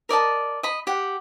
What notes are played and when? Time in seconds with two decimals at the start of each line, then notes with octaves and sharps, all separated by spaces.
0.09 A#4 D5 D#5 A5
0.63 D#5 B5
0.87 G4 F#5